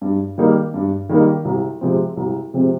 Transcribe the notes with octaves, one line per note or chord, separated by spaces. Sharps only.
G2
D#3 G3 A#3 D#4
G2
D#3 G3 A#3 D#4
C2
C3 F3 G#3 C4
C2
C3 F3 G#3 C4